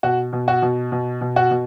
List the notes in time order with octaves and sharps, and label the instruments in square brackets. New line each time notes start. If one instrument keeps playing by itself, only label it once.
[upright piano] B2 F#4
B2
F#4
B2
B2
B2
F#4
B2